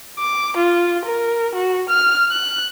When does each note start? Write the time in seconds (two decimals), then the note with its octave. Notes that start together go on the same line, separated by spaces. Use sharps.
0.19 D6
0.57 F4
1.05 A#4
1.54 F#4
1.89 F6
2.31 F#6